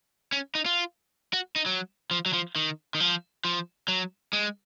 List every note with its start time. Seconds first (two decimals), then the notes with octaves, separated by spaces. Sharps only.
0.32 C#4
0.55 D#4
0.66 F4
1.33 F#4
1.56 D#4
1.66 F#3
2.11 F3
2.26 F#3
2.33 F3
2.56 D#3
2.95 D#3
3.00 F3
3.45 F3
3.88 F#3
4.33 G#3